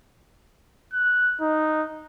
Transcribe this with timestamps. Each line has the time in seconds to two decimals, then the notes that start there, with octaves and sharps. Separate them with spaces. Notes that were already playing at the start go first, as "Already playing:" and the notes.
0.93 F#6
1.41 D#4